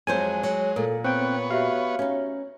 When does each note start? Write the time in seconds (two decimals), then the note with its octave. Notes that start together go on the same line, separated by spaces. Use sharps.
0.07 F2 F#3 G#3 C5 G#5
0.43 F#3
0.76 A#2 A4 A#4
1.04 B3 C4 C#5 G5 F#6
1.50 F#4 G4 E5 F5
1.99 C#4 D#4